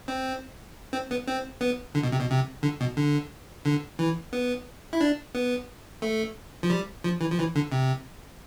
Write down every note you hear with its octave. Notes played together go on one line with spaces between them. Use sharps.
C4
C4
B3
C4
B3
D3
B2
C3
B2
C3
D3
B2
D3
D3
E3
B3
E4
D4
B3
A3
F3
G3
F3
E3
F3
E3
D3
C3